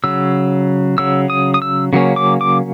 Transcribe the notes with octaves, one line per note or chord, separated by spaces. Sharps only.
C#3 F#3 E6
C#3 F#3 E6
D#6
D#6
E6
C#3 F#3 A#3 C#4
D6
D6